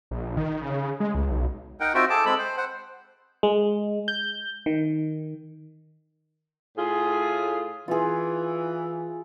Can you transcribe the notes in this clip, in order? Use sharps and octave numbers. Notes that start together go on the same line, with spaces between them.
A#1
D#3
C#3
G#3
C#2
B1
D#4 A#4 F#5 G5
C4 D#4 F4 F#4 E5 G5
G#4 A4 G5 A5 D6
G#3 C4 A4 B5
C5
C5 F#5
G#3
G6
D#3
A2 F4 G#4
E3 F4 G#4